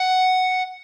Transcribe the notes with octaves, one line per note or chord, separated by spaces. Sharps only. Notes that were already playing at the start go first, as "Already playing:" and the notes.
Already playing: F#5